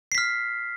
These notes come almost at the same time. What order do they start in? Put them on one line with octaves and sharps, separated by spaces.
C7 B6 F6